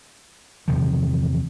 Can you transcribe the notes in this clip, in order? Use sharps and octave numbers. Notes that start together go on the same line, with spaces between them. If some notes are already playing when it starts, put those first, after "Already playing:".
E2 C3 D#3 F3